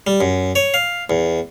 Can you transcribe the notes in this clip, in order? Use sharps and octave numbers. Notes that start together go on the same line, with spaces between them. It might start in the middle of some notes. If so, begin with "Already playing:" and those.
G3
F#2
C#5
F5
E2